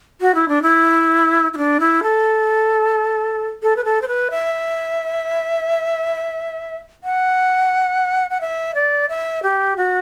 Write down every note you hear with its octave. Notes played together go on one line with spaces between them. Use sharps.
F#4
E4
D4
E4
E4
D4
E4
A4
A4
B4
A4
C5
B4
E5
F#5
F#5
E5
D5
E5
G4
F#4